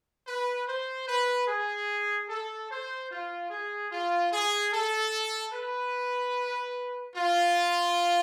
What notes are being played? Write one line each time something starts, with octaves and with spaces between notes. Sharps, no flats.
B4
C5
B4
G#4
A4
C5
F4
G#4
F4
G#4
A4
B4
F4